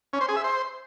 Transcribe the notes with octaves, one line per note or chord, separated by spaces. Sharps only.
C#4
C5
G#4
E5
C5